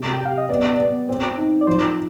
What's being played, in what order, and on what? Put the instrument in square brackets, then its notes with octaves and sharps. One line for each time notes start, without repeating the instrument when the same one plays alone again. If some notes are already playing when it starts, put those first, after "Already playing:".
Already playing: [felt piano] C3
[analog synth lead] G5
[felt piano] G4 [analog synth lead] F5
[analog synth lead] D#5
[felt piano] B3 [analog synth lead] D5
[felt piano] B3
C4
D#4
[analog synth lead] D5
[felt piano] F3 [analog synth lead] C5